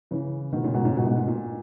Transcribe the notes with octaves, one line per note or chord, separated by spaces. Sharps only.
C#3 E3
B2 D#3
A#2 C#3
G#2 B2
A#2 C#3
G#2 B2
G#2 B2
A#2
A#2